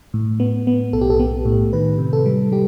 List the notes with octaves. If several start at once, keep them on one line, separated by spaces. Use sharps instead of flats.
A2
B3
B3
B1 A4
G4
A4
B3
A2
D#3 B4
C3
A4
G3
G3 G4